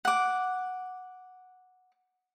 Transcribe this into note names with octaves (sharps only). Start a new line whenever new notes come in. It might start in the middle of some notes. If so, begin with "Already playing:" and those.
F#5 D6